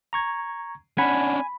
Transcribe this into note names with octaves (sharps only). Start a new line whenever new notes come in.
A#5 C#6 G#6
C#4 D4 F#5 G#5 B5